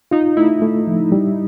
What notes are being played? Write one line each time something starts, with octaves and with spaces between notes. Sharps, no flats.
D#4 F4
A3 E4
A3
F3
G3